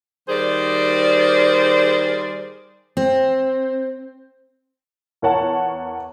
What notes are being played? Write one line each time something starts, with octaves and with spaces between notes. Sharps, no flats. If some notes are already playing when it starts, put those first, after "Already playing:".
D#3 G3 G#4 C5 D5
C4
E2 A#4 C#5 F#5 A5